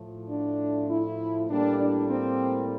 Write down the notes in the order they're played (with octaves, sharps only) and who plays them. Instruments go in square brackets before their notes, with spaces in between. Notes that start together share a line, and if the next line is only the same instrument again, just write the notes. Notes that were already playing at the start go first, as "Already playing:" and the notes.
Already playing: [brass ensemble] A2 F3 A3
D4
E4
A2 G3 A#3 D4
D4
C4